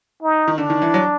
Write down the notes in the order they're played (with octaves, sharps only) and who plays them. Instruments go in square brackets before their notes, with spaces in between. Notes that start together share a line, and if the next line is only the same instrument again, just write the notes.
[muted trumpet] D#4
[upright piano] D#3
[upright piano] D3 [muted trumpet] D4
[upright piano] D#3
E3
F#3